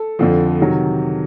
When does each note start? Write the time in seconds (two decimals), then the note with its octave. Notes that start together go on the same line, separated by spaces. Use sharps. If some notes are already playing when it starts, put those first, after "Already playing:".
Already playing: A4
0.19 F2 D3 F3
0.61 C3 D#3 F#3